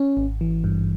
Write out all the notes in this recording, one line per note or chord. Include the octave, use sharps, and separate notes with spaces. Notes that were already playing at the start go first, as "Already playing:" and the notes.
Already playing: C#4
G#1
E3
G2